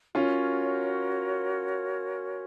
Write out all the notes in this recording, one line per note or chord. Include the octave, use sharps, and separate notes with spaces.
C#4 F4 F#4 A#4 C#5